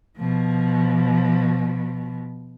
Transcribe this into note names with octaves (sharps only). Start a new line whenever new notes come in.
B2 F3